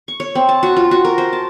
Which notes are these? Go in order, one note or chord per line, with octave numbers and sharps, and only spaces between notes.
C#6
C#5
C4
A5
F#4
F4
F#4
A#4
C5
A5